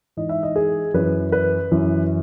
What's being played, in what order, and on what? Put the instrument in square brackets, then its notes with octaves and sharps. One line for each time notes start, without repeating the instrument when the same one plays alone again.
[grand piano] G#2 E3 D#5
E5
D#5
G#4
F#2 E3 B4
B4
F#2 E3